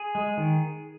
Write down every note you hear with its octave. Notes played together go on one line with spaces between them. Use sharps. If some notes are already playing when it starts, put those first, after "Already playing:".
Already playing: G#4
G#3
D#3